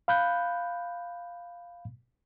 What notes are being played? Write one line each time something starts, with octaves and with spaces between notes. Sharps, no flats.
F5 B5 F#6 G6